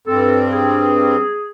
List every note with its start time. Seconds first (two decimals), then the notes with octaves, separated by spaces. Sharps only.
0.07 G2 C4 A4
0.53 G#4